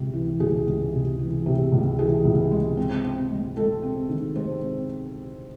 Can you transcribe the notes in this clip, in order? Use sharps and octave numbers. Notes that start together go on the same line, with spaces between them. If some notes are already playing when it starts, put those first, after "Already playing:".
Already playing: C#2 C3
E3
C#2 G#4
C#2
C3
E3
C3
C#2
E3 G#4
C#2
G#3
C4
C4
G#3
G#3 A4
C4
D#3
G#3 C5
C4